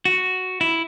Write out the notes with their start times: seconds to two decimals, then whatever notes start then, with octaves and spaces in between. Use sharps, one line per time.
0.05 F#4
0.61 E4